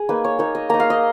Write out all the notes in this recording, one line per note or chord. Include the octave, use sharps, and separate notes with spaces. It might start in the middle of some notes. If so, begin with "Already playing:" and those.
Already playing: G#4
A#3 D#4 B4
C#5
A#3 D#4 C#5
D#5
A#3 D#4 A#5
F5
D#5